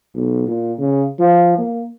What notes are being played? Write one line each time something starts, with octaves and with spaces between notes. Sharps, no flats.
B1
A#2
C#3
F3
A#3